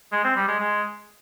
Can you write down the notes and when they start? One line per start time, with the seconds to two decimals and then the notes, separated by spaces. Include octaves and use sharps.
0.12 G#3
0.24 C4
0.36 G3
0.48 G#3
0.59 G#3